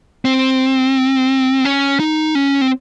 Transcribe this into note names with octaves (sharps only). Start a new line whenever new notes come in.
C4
C#4
D#4
C#4
C4